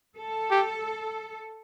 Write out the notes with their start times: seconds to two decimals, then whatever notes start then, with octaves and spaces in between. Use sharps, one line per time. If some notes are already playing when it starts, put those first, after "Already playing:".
0.17 A4
0.51 G4